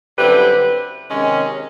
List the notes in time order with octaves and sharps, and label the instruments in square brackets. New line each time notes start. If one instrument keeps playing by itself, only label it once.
[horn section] F#2 D3 G3 C4 E4 [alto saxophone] B4
[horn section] C3 D#3 G#3 C#4